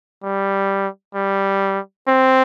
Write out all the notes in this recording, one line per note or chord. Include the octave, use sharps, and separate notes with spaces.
G3
G3
C4